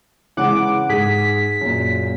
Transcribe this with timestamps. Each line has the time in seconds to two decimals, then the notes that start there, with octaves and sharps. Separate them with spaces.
0.37 C#3 E3 G#3 F#5 D6
0.89 G#2 G#4 B6
1.61 F#2 A#2